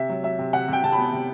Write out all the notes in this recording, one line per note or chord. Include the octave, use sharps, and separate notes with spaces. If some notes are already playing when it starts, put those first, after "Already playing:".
Already playing: C3 E5
F#3
F#3 E5
C3
C3 F#5
C3 G5
C3 A5
B5
B3
C3